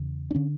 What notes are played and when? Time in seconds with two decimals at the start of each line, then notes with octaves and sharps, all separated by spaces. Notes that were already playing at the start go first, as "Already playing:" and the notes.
Already playing: E2 C#3
0.31 D4
0.35 D3 C#4